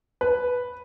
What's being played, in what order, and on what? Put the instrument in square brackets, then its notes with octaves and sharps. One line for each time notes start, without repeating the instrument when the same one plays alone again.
[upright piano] B4